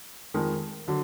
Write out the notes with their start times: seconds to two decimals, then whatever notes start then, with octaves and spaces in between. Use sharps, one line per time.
0.34 F2 D#3 G#3
0.88 D3 F#3